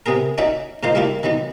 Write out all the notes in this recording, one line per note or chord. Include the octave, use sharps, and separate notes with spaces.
C3 B3 G#4 A#4
C#4 D#4 F#4 C#5 D5 E5
G#2 D#3 D#4 F4 C5
G3 A3 A#3 E4 F4
D#3 E3 F#3 B3